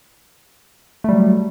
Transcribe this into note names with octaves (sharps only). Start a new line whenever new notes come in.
F#3 G3 A3